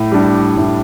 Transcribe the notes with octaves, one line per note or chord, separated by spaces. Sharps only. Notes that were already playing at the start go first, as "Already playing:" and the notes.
Already playing: A2
G3 D4
A2